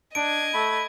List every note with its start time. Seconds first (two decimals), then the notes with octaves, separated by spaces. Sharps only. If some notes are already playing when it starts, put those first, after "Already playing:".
0.15 D4 D#5 G#6 D7
0.54 A3 B5